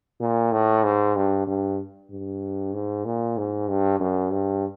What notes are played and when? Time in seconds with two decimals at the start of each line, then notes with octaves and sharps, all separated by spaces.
0.20 A#2
0.52 A2
0.83 G#2
1.16 G2
1.47 G2
2.11 G2
2.74 G#2
3.05 A#2
3.37 G#2
3.68 G2
4.00 F#2
4.32 G2